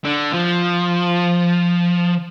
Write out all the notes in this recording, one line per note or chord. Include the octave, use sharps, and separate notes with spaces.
D3
F3